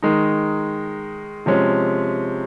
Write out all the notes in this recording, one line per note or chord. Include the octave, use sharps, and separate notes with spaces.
D#3 G#3 D#4
C3 F3 G#3 C#4